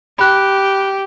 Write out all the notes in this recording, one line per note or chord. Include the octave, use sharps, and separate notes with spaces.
G4 B5 F#6